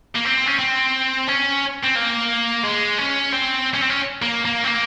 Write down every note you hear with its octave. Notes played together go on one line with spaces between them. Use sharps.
A#3
C4
C#4
C4
C#4
C4
A#3
G#3
C#4
C4
C#4
C4
C#4
A#3
A#3
C4
A#3